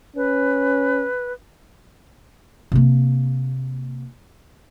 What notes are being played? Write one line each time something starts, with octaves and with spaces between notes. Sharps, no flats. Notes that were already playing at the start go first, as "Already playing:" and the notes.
C#4 B4
C3 A#3